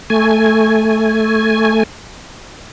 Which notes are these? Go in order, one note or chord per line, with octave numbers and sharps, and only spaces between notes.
A3 G#5